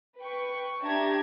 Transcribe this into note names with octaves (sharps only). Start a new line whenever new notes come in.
B4 G5 C#6
D4 G4 E5 A5 A#5 G#6